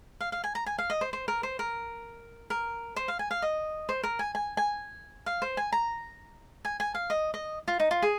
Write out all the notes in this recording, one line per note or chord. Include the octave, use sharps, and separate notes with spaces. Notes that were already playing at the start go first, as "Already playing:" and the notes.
F5
F5
G#5
A#5
G#5
F5
D#5
C5
C5
A#4
C5
A#4
A#4
C5
F5
G#5
F5
D#5
C5
A#4
G#5
G#5
G#5
F5
C5
G#5
A#5
G#5
G#5
F5
D#5
D#5
F4
D#4
F4
G#4